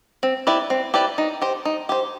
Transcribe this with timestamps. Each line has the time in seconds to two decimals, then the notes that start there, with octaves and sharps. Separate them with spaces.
0.23 C4
0.47 E4 G4 B4 D5
0.70 C4
0.94 E4 G4 B4 D5
1.18 D#4
1.42 G4 C5
1.65 D#4
1.89 G4 C5